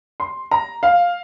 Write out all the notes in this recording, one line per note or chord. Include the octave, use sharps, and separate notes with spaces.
C6
A#5
F5